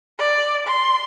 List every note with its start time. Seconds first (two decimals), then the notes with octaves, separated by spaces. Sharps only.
0.19 D5
0.67 C6